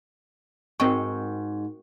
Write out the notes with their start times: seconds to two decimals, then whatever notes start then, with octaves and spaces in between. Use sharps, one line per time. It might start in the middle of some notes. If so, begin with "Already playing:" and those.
0.80 G#2 C4 F#4 A#4 D#5 G5 C#6